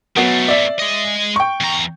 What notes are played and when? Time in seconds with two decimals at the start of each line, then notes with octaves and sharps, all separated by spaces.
0.16 B2 F#3 A3 B3 C7
0.48 D5 E5
0.79 G#3 D#5
1.36 G5 C#6
1.61 E2 A#5